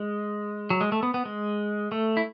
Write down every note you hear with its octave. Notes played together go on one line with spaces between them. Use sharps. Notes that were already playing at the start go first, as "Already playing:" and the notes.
Already playing: G#3
F#3
G#3
A3
B3
B3
G#3
A3
E4